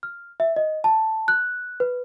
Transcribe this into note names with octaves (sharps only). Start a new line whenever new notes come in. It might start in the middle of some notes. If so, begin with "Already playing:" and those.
F6
E5
D#5
A5
F#6
B4